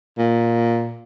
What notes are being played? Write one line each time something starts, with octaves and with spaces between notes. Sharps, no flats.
A#2